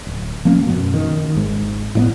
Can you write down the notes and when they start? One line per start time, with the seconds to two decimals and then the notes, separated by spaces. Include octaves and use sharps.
0.06 D1
0.45 F3 A3 A#3 C#4
0.67 F#2 B2
0.94 D#3
1.36 G#1 G#2
1.95 A2 G3 B3